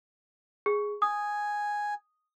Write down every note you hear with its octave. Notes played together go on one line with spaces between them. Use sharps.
G#4
G#5 D#6